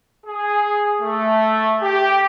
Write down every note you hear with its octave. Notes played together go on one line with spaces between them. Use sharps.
G#4
A3
G4